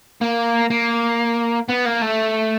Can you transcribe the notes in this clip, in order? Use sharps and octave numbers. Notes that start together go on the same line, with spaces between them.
A#3
A#3
B3
A#3
A3